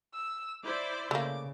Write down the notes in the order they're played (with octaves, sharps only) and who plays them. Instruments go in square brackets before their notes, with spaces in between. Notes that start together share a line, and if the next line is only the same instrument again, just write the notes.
[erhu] E6
[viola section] E4 C5 D5 [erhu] D6
[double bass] C#3 [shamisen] A3 A#3 [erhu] D6